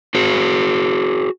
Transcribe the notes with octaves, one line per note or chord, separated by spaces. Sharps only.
F#4 G#4 C5